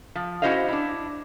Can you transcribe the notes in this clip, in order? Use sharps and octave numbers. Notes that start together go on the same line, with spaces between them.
F3
C#4 E4 F#4 C5 D#5 F5
D4 E4